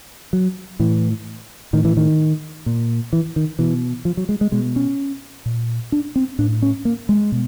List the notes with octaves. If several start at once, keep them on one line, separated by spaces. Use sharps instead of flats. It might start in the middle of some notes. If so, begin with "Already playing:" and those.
F#3
A2 E3
A2 D#3
E3
D#3
A#2
E3
D#3
B2 E3
F3
F#3
G#3
G#3
B2 G#3
C#4
A#2
D4
C4
A2 D4
C#4
A#3
G#3
B2